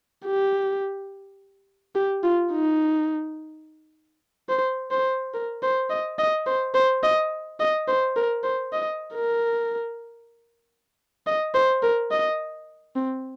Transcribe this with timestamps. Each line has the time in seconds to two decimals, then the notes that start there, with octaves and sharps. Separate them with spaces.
0.26 G4
1.95 G4
2.24 F4
2.52 D#4
4.49 C5
4.91 C5
5.34 A#4
5.63 C5
5.90 D#5
6.19 D#5
6.46 C5
6.74 C5
7.03 D#5
7.60 D#5
7.88 C5
8.16 A#4
8.44 C5
8.73 D#5
9.14 A#4
11.27 D#5
11.54 C5
11.83 A#4
12.11 D#5
12.96 C4